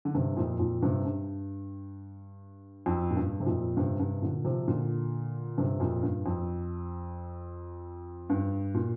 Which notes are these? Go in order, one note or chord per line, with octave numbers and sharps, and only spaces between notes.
D3
G2 C3
F2 A#2
F2 A#2
G2 C3
G2
F2
A#2
G2
C3
F2 A#2
G2 C3
G2 C3
A#2 D3
C3 F3
A#2 D3
G2 C3
F2 A#2
G2
F2
G2
A#2